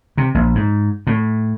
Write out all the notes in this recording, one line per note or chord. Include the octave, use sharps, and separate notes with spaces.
C3
A#1
G#2
A2